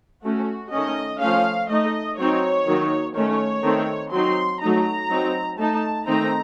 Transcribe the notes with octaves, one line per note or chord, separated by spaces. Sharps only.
A3 C#4 F#4
D#3 A3 C#4 D#5
F3 A3 C#4 F5
A3 D#4 D#5
F#3 C4 D#4 C#5
D#3 F#3 A#3 D#4
D#3 A3 C#4 C#5
D#3 A3 C4
F#3 C4 D#4 C6
F#3 A3 D#4 A#5
F#3 C4 D#4
A3 D#4 A5
D#3 A3 C4 D#4 A#5